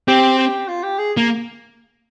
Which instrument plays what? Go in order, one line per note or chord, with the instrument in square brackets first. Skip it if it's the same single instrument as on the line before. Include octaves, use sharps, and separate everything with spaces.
[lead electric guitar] C4 [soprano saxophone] G4
[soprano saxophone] G4
F4
G4
G#4
[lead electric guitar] A#3